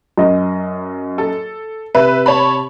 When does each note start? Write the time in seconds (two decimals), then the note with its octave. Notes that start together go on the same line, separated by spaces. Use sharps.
0.18 F#2 D#5
1.18 A4
1.95 C3 B4 E5
2.26 C#5 A5 B5